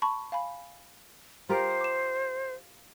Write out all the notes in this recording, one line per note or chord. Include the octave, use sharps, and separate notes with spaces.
A5 B5 C#6
F5 G#5 B5
F4 G4 A#4 C5
D6 E7